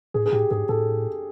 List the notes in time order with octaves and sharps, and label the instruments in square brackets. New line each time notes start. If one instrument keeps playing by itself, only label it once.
[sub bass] A2 [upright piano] G#4
[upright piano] G#4
[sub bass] A2 [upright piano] G4
[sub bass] G#2 [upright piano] G#4
[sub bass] A2 [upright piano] A4